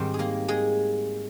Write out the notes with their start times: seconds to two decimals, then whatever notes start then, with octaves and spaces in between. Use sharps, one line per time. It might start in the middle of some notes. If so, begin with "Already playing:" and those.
Already playing: G#2 D#3 G3 C4 C5
0.14 G#4
0.19 A#3 A#4
0.48 G#3 G#4